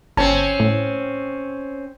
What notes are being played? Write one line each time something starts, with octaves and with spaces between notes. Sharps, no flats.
G1 C4 C#4 A5
A2